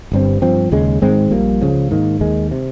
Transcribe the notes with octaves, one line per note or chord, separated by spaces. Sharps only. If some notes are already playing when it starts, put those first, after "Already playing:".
G1 G2 G3 C4
G2 F3 C4
D#2 C#3 G#3
G#2 D#3 G#3 C4
A#1 A#2 G3 A#3
C#2 C#3 F3
G#2 D#3 A#3
D#2 D#3 G#3
C3